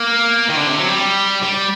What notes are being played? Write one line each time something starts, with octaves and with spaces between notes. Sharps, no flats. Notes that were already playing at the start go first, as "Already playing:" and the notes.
Already playing: A#3
D#3
D3
C3
F#3
G3
G3